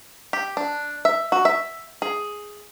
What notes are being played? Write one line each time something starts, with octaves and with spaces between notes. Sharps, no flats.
G4
D4
E5
F#4
E5
G#4